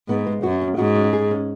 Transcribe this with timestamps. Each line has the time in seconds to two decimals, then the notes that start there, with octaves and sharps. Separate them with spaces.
0.08 G#2 B3
0.27 G#3
0.43 F#2 F#4
0.61 C#4
0.78 G#2 F#4
0.96 C#4
1.13 G#4
1.31 C#4